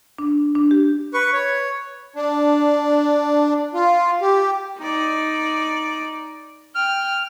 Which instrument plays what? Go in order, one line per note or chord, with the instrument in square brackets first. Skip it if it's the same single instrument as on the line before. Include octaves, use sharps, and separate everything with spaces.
[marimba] D4
D4
G4
[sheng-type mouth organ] B4 C#6
C#5
[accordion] D4
F4
G4
[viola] D#4 D5
[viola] G5 [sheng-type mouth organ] F6